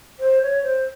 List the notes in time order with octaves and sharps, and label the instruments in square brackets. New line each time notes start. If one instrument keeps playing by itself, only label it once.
[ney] C5
C#5
C5